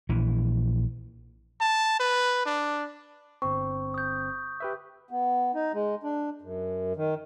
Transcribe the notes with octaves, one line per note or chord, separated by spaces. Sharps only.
A#1 E3
A5
B4
D4
G1 C4 C#6
D#6 G6
G4 B4 E5
B3
D#4
G#3
D4
F#2
D#3